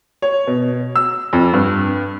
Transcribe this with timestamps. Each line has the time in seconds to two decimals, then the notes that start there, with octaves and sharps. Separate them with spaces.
0.22 C#5
0.47 B2
0.96 E6
1.33 F2
1.53 G2